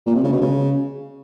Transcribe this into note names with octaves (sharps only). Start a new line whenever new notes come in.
A#2
C3
C#3
B2
C#3